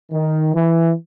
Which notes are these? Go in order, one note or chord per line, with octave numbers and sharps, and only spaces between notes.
D#3
E3